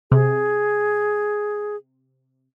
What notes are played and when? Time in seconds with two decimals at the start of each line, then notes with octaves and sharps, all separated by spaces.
0.12 C3 G#4